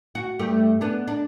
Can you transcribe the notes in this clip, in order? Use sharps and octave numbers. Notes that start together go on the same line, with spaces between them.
F#4
G2 A3 G4
B3 D4
D4